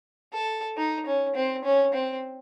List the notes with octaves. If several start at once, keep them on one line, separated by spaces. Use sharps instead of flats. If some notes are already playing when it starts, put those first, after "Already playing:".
A4
D#4
C#4
C4
C#4
C4